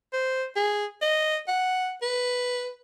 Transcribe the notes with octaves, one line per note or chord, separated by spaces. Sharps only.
C5
G#4
D#5
F#5
B4